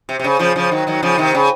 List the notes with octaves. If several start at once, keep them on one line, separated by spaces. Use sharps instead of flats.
C3
C3
C#3
C#3 F3
C#3 F3
D#3 F#3
D#3 F#3
C#3 F3
C3 D#3
C#3